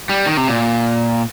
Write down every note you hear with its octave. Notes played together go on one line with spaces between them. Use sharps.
G3
D#3
C3
A#2